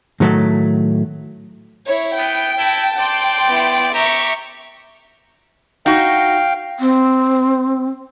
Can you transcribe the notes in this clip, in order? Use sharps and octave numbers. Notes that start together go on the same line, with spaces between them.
A2 D#3 F#3 A3
E4 C#5
B3 G5
E4 A5
D5 G5 C6
B3 E4
G4 E5 A#5 C#6
D#4 F#4 F5 G5
C4